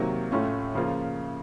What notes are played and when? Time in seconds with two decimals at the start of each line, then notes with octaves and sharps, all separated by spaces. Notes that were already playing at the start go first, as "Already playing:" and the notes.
Already playing: C3 D#3 F#3 A#3
0.31 A2 A3 C#4 F4
0.75 C#3 F3 A#3 F4